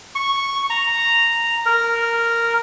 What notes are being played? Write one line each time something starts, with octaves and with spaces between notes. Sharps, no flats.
C#6
A#5
A#4